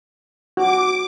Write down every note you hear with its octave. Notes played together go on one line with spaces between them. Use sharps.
F#4 D6